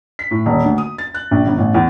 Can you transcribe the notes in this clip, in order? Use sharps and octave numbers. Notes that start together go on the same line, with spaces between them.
B6
A2
D#1
D2
D#6
A6
F#6
A#1
G1
A1
E2